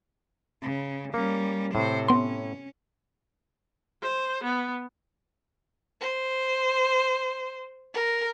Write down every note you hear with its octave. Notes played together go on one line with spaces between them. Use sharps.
C#3
G3 A#3 C#4
A2 C3 C5
B3 C#4 C6
C5
B3
C5
A#4